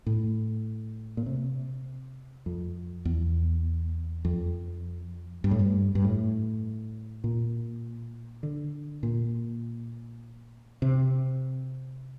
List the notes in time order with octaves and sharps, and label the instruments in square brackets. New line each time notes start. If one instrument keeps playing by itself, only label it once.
[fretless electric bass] A2
A#2
C3
F2
E2
F2
G2
A2
G2
G2
A2
A#2
D3
A#2
C3